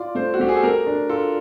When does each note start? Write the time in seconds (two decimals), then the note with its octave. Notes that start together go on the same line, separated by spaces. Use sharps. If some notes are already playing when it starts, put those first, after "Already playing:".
Already playing: F4 D5
0.15 A3 C5
0.34 F#4
0.39 A3 G4
0.48 G#4
0.56 A4
0.63 A3 A#4
0.87 D4
1.09 F4 A4